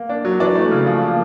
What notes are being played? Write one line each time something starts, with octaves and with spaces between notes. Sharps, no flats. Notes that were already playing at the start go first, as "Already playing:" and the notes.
Already playing: A#3
D4
F#3
E3 D4 D5
A3
C#3
F3
A#3